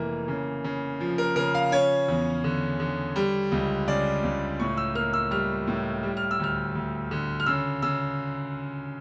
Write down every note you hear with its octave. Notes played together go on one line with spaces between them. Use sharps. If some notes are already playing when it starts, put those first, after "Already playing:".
Already playing: F1 E3 A#3
C#3
C#3
F3
A#4
C#3 A#4
F5
C#4 C#5
E2
D3
D3
G3
C#2
C#3 D5
C#2
A2 C#6
E6
A#3 F6
E6
G3 F6
A2
G3
F6
E6
D2 F6
D2
D3
F6
C#3 E6
C#3 E6